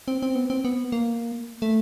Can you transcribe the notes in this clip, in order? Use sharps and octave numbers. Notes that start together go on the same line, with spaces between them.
C4
C4
B3
C4
B3
A#3
A3